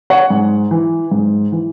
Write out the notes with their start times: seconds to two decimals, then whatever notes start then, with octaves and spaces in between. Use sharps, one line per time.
0.10 C#5 F#5
0.30 G#2
0.71 E3
1.11 G#2
1.52 E3